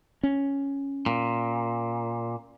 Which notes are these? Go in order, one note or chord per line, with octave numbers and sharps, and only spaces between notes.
C#4
A#2